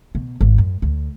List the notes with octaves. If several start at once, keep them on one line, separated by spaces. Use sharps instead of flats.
B2
G#1
F#2
D2